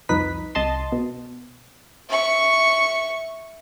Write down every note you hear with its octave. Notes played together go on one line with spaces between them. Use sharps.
C2 F2 D#4 B4 B6
C2 D#5 A5 C6
B2
E5 C#6